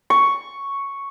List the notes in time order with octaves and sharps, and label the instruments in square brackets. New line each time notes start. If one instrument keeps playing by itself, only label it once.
[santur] C#6